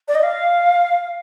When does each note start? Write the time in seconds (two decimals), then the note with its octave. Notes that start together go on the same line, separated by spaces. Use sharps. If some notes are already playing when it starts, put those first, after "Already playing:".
0.08 D5
0.15 D#5
0.23 F5